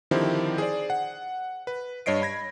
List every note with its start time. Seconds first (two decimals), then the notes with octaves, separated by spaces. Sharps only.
0.11 D3 D#3 F3 C4 E4 G4
0.58 G#4 C5 D5
0.90 F#5
1.67 B4
2.06 G2 C#5 D#5 C7 D7
2.22 B5 G#6 A#6